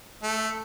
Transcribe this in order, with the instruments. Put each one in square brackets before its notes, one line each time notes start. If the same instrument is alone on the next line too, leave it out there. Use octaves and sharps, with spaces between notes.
[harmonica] A3